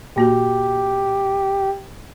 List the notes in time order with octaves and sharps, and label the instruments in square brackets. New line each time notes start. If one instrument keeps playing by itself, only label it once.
[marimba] A#2 A#3 F#4 [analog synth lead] G4